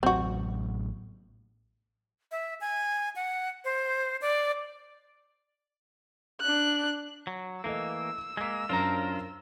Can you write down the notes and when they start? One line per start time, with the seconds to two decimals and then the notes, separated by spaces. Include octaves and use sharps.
0.03 A1 A2 F#3 C4 F#4
2.31 E5
2.61 G#5
3.16 F#5
3.64 C5
4.21 D5
6.41 D4 F#6
7.27 F#3
7.64 E3 A3 A#3 D#5 E6
8.37 G#3 A#3 G#6 B6
8.69 F#2 C#4 D4 F4 A#4 C5 A#5